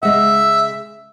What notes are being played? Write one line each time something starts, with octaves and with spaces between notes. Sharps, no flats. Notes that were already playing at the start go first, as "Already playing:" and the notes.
C#3 G#3 E5 F#5